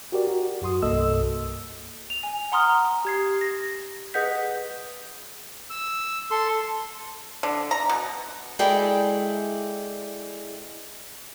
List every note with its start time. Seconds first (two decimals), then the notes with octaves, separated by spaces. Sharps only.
0.12 F#4 G4 A#4 D5
0.27 F#4
0.62 F#2 F#4 C6 D#6
0.82 C2 G2 A#3 A4 D#5 E6
2.10 F7
2.23 G#5
2.52 F#5 A#5 C6 D#6 F6
3.05 G4 G#6 C7
3.41 A#6
4.14 G#4 B4 D#5 F#5 G6 B6
5.70 E6
6.31 A4 C6
7.43 D3
7.71 A#5
7.89 B2
8.59 G#3 E4 G#4 A4 D5 G5